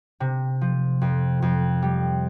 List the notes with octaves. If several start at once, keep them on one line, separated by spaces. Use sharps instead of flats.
C3
F3
F2
F2
G3